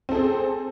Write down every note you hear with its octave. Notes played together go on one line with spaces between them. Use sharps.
C4 G#4 A4